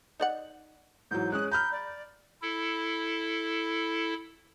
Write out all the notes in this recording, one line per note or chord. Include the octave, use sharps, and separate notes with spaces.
D#4 D5 F#5
G#2 E3 F#3 G6
G#3 C#4 D#6 F#6
A#5 B5 F6 G6
D5
E4 A4